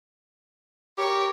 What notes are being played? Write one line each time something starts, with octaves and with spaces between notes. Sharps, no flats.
G4 A#4 C#5